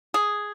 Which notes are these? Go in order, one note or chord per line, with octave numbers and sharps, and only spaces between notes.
G#4